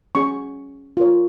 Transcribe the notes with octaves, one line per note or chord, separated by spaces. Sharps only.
C#4 G#4 C#5 C#6
F4 A#4 C#5